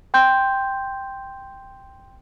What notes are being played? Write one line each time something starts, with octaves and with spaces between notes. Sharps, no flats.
G5 C6 G6